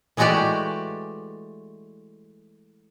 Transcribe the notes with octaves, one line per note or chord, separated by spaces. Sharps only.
E3 G#3 A3 F#4 G4 D5